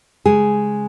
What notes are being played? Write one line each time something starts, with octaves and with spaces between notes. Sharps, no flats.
C#3 G#3 G#4